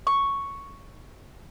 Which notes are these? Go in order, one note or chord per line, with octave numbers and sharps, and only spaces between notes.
C#6